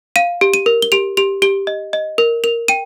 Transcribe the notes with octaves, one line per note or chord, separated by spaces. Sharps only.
F5 D#7
G4
D#7
A#4
G7
G4 F7
G4 F7
G4 G7
D#5
D#5
A#4
A#4 F7
G5 D#7